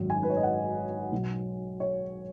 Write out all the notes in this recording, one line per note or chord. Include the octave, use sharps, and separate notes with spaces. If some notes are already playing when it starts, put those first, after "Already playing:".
Already playing: G#1 F#2 D#3
G#5
B4
C#5
D#5
F#5
B1 B2 F#3
C#5